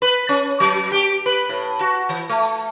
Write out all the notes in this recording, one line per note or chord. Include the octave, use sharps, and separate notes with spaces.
B4
C#4
F#3
G4
B4
A2
F#4
E3
A3